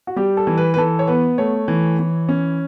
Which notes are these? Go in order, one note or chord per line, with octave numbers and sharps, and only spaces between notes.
F#4
G3 G4
A4
E3
B4
B4
E3 A4
C#5
B3 B4
A3 C#5
E3
E3
C#4